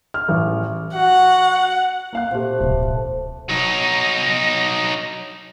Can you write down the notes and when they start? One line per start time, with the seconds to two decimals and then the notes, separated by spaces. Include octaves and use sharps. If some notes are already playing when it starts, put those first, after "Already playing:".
0.14 F6
0.29 A1
0.96 F#4 F#5
2.13 A#3 F5 F#6
2.31 A#2 A3 C4 G4
2.60 D1 B1
3.50 F#3 D#4 A#6